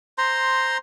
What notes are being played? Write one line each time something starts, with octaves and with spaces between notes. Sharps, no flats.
C5 A#5 C6